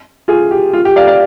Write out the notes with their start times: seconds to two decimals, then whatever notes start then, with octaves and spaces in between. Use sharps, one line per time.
0.28 F4 G#4
0.51 G4
0.73 F4
0.85 G4
0.96 D5 F5
1.07 D5 F5